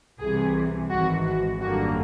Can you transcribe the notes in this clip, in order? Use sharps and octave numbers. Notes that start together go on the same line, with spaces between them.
C2 C3 E3 G#4
G#1 G#2 E3 F#4
F#4
G#1 F#2 D3 G3 A#3 F#4